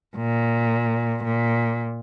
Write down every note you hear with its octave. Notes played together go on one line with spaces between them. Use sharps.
A#2
A#2